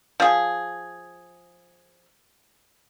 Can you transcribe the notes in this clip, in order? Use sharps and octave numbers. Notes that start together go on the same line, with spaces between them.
F3 G#4